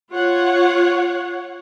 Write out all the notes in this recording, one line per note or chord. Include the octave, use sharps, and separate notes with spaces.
F4 C#5 F#5